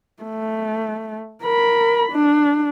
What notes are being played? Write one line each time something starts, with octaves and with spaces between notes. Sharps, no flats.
A3
A#4 B5
D4